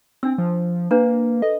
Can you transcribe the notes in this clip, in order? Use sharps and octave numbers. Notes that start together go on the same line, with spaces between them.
C4 D4 E6
F3
A#3 D4 B4 A#5
A4 D#5